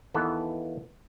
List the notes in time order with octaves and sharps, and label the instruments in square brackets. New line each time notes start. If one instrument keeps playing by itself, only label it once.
[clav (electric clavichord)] D#2 D#3 E3 B3 A4 F#5